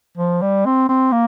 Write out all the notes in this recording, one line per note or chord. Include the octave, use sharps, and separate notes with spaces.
F3
G3
C4
C4
A#3